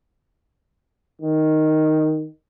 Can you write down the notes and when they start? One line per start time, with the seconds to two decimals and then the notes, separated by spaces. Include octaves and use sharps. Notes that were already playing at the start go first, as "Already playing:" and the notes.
1.21 D#3